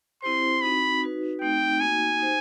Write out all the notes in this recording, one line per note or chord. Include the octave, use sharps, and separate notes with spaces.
C4 E4 G4 C5 C6
C4 D#4 F#4 B5
D#4 F#4 B4
A3 C4 D#4 G5
A#3 D#4 F#4 G#5
D#4 G4 C5